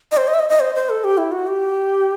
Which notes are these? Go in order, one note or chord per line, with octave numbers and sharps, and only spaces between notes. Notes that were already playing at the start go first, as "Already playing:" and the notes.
D#5
C5
D#5
E5
D#5
D#5
C5
C5
A4
G4
E4
F#4
G4